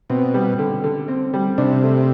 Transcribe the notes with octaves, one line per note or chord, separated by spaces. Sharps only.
B2 C4
G3
D3
D3
C4
G3
C3 D4
A3